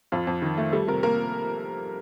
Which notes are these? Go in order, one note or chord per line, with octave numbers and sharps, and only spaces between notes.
F2 F4
F2
D#3
A3
G3 A4
C3 A#4
A#3 A#4